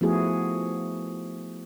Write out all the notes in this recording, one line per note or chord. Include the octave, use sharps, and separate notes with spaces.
F3 A3 B3 E4 F#4 G#4